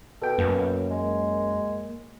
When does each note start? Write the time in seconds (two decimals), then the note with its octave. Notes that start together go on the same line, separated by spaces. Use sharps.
0.22 B2 A4 G5
0.38 F#2 A#3
0.90 G#3